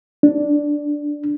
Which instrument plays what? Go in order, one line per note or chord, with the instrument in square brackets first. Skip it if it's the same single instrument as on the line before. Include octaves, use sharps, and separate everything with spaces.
[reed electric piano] D4